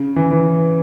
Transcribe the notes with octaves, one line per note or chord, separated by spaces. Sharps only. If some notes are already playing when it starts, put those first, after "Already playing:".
Already playing: C#3
E3
E3